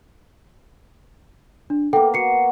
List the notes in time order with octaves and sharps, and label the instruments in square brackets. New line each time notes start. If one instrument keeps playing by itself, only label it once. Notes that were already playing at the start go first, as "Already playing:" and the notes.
[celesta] D4
[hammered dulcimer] A#3 B3 [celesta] A4 F#5 G5
[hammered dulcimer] F#4 [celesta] C7 C#7